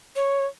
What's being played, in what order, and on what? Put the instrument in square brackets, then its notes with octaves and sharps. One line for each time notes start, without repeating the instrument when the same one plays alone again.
[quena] C#5